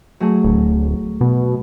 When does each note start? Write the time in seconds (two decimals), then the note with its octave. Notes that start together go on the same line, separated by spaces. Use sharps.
0.20 F#3 A3 G#4
0.44 D1
1.21 B2